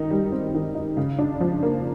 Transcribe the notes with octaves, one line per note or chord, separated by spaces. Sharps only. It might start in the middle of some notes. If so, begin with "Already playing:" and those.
Already playing: D#3 D#4
G3
C4
D#3
D#4
C#3
D4
F3
A#3